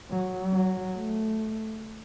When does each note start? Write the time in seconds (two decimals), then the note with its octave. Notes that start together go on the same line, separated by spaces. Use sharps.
0.11 F#3
0.53 F#3
0.97 A3